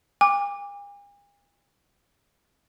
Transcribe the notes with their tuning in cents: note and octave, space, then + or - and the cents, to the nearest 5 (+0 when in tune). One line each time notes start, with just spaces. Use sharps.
G#5 -45 D6 +0